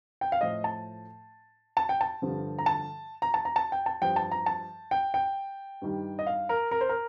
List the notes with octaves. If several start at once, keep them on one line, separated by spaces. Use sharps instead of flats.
G5
F5
A2 F3 D#5
A5
A5
G5
A5
G2 D3 F3
A#5
A5
A#5
A5
A#5
A5
G5
A5
G2 F3 G5
A5
A#5
A5
G5
G5
G2 D#3 G3
D#5
F5
A#4
A#4
C5
A#4